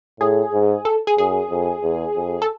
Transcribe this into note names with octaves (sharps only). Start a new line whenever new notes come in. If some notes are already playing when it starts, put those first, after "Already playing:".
A2 G#4
G#2
A4
G#4
F#2 G#4
F2
E2
F2
A4